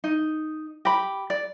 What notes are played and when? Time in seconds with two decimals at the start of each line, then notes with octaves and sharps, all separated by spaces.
0.04 D#4
0.85 G4 B5
1.30 D5